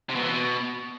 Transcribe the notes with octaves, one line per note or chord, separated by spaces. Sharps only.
C3
B2
E3
B2